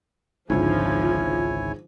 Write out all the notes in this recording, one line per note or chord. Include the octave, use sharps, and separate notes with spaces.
G#1 C#2 G#2 D3 F3 E4 C#5 G#5